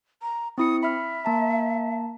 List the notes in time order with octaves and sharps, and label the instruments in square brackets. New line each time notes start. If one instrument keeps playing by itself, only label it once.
[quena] A#5
[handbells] C4 E4 C#7 [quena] D#6
[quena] E5 [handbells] B5 F6
[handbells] A#3 A5 A#5